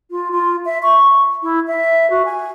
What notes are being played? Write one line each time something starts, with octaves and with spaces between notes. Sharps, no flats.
F4
F4
E5
C#6
E4
E5
F#4
G#5